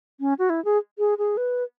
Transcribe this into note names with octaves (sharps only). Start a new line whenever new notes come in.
C#4
F#4
E4
G#4
G#4
G#4
B4